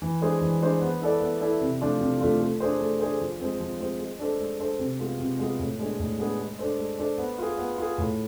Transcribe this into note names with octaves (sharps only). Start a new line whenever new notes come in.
E3
G#3 D4 G#4 C5
E3
G#3 D4 G#4 C5
B3
E4 A4 D5
B3
E4 A4 D5
C3
F3 A3 D4 F4
C3
F3 A3 D4 F4
A3
D4 G#4 C5
A3
D4 G#4 C5
F3
G#3 C4
F3
G#3 C4
G#3
D4 A4 C5
G#3
D4 A4 C5
C3
G#3 B3 F4 G#4
C3
G#3 B3 F4 G#4
A2
G#3 B3 D4 G#4
A2
G#3 B3 D4 G#4
G#3
D4 A4 C5
G#3
D4 A4 C5
B3
F4 G#4
B3
F4 G#4
A2